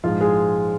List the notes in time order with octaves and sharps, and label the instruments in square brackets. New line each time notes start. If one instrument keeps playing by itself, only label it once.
[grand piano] A#1 G#2 F3 G#3 F4
G#3 G#4